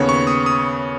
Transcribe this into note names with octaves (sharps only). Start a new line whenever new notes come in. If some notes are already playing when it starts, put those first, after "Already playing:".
Already playing: D#2 C#3 B3 C#5
C#6
D#6
D#6